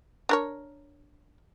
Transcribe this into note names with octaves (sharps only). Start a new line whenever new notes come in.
D4 A#4 C#5